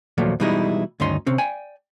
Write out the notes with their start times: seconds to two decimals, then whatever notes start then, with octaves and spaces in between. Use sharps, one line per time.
0.18 D#2 A#2 F3 F#3 A3
0.40 B2 E3 G3 G#3 D#4 E4
1.00 D2 G2 D#3 C#4 D#4 C6
1.27 C3 C4 C#4
1.38 D5 G5 G#5